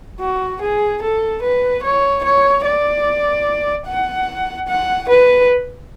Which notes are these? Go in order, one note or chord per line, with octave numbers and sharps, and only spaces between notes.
F#4
G#4
A4
B4
C#5
C#5
D5
F#5
F#5
B4